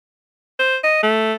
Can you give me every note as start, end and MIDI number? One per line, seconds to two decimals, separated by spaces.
0.59 0.77 72
0.84 1.03 75
1.03 1.34 57